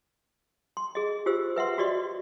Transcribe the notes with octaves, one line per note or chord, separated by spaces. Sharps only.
C6
G#4 D#5
F4 G4 C5 E6
B4 E5 F#5 C6
F#4 G4 D5 D#5 C6